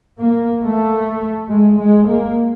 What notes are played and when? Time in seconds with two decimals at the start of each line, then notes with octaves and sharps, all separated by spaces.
0.20 A#3
0.64 A3
1.50 G#3
1.79 G#3
2.08 A#3